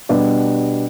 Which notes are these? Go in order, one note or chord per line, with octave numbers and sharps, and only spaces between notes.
B2 G3 B3 D4 G4